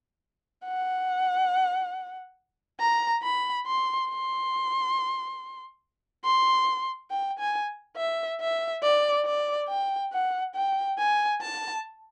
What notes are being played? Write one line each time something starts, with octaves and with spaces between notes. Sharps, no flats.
F#5
A#5
B5
C6
C6
C6
G5
G#5
E5
E5
D5
D5
G5
F#5
G5
G#5
A5